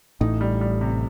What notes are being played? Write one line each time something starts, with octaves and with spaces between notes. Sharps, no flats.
A1 A2 D#4
G3
G3
C3